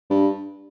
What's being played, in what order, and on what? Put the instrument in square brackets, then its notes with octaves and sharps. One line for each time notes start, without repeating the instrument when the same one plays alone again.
[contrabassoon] G2